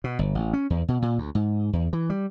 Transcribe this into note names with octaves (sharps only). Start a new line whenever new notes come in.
B2
G1
A1
C#4
E2
B2
A#2
D2
G#2
E2
E3
G3